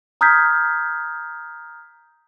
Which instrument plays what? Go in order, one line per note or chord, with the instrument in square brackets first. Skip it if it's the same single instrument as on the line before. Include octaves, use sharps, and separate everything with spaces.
[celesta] A#5 D#6 F6 G6 G#6 B6